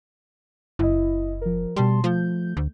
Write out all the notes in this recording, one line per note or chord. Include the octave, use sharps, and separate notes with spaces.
F#1 E4 D#5
F3 A#4
B2 G3 A5 C6
F3 A3 G6
D2